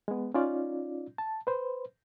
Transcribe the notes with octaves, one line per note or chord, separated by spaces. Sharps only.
G#3 B3
C#4 D#4 F4 D5
A5
B4 C5